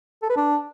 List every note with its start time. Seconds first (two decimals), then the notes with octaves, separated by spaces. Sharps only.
0.23 A4
0.29 B4
0.36 D4